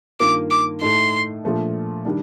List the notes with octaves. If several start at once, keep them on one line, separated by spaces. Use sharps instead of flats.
G2 D#3 A#3 F4 D6
D6
A2 A3 D#4 C6
A#2 F3 A3 D4
D#3 G3 D4